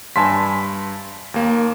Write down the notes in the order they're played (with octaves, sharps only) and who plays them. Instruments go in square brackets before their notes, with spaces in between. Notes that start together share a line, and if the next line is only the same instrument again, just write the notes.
[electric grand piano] G2 B6 [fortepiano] G#5 A5 C6
[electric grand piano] D#2 A#3